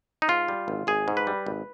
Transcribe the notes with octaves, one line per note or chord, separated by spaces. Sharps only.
D#4
G#2 F4
G3
G#1
G#1 G#4
G#2
B4
G3
G#1